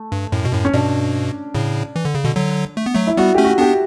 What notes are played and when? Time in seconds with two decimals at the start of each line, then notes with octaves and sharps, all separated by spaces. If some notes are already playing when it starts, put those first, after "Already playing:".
Already playing: A3
0.12 G2
0.32 F#2 A2
0.45 B2
0.53 F#2 A2
0.65 C#4
0.73 G2 B2 D4
1.55 A2 C#3
1.96 E3
2.05 D3
2.14 C#3
2.25 B2 D3
2.36 D3 F#3
2.77 A3
2.86 B3
2.95 F#3 A3
3.07 E4
3.17 G3 B3 F#4
3.34 A3 C#4 G4
3.45 F#4
3.58 B3 D4 G4